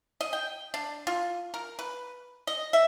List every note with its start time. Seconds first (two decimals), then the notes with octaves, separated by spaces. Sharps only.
0.21 D#5
0.33 G5
0.74 D4
1.07 F4
1.54 A#4
1.79 B4
2.47 D#5
2.73 E5